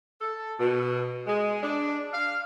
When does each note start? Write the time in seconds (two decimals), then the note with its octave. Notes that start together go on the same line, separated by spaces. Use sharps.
0.20 A4
0.58 B2
1.26 G#3
1.62 D4
2.12 F5